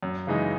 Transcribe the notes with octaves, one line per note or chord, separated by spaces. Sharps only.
F#2
C#3 E3 G#3 D#4